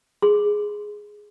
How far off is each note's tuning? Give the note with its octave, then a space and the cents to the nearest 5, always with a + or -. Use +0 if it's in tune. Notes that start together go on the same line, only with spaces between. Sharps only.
G#4 +0 C6 +0